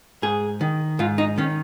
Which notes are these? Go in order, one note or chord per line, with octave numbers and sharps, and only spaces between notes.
G#2 G#4
D#3
G#2 F4
D#4
D#3 C#4